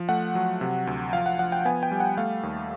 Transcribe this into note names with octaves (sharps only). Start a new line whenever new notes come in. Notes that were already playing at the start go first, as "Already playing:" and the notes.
Already playing: F3
A3 F#5
F#3
C3
D2
F3 F5
F#5
F3 F#5
G5
B3 G#5
G5
G3
F#5
A3 F5
D#2